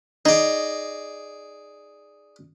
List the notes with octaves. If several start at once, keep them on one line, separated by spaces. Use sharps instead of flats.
D#4 G#4 D5